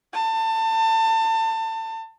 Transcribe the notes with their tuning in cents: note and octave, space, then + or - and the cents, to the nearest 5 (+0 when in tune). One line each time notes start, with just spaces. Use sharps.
A5 +30